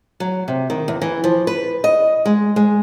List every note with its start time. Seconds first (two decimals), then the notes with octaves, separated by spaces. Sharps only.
0.20 F#3
0.48 C3
0.70 D#3
0.88 E2
1.01 E3
1.24 F3
1.47 B4
1.84 D#5
2.26 G#3
2.56 G#3